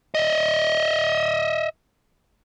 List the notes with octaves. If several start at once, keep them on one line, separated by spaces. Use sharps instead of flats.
D#5 E5